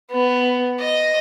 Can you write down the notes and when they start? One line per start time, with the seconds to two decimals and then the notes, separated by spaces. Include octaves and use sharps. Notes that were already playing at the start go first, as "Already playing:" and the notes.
0.11 B3
0.80 D#5